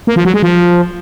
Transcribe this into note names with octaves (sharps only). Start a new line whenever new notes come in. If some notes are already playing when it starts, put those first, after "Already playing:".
A#3
F3
F#3
G#3
F3